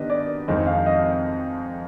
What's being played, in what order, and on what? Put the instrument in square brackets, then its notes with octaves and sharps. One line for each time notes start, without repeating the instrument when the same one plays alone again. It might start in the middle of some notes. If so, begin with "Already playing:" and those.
Already playing: [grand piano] D#3 B3 D4 G4 B4 [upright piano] D#5
[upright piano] D5
[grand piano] F2 D#3 G#3 C4 [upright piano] D#5
[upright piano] F5
D#5